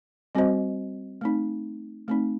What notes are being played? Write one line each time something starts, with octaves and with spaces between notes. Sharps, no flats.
G3 C4 F#4 C5 D#5
A3 C4 D#4
A3 C4 D#4